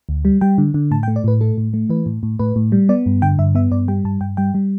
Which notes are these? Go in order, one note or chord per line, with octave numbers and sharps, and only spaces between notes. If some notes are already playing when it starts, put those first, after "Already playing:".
D2
G3
G3 G5
D3
D3
A2 A5
G5
A3
D5
A2 B4
A3 A4
A2
A3
E3 B4
A2
A2
A2 B4
A2
G3
B3 D5
G2
D3 G5
G2 E5
B3 E5
G2 D5
G3 G5
G2 A5
G2 G5
G3 G5
G3